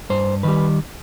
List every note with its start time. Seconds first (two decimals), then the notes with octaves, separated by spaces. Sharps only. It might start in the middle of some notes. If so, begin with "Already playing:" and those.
0.10 G2 C5
0.43 D#3 G3 B4